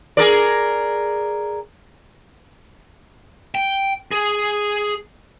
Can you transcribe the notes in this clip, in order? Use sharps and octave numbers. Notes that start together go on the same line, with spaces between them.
G#4 A#4 D5
G5
G#4